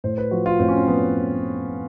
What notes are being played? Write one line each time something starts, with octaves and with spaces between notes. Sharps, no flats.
A2 C5
B4
F3 F#4
F4
A2 C4
C#4
C4
F3 B3